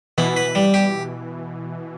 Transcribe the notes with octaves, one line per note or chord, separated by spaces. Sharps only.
B2 E3 B3
B4
G3
G4